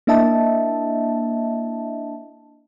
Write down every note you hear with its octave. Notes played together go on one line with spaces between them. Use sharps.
A#3 D4 E4 D#5 E5 A5